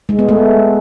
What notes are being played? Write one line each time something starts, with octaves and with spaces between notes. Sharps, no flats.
G#3
B3
A3